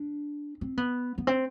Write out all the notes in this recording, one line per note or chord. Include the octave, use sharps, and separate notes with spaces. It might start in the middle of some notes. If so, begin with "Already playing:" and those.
Already playing: D4
C4
B3
B3
C4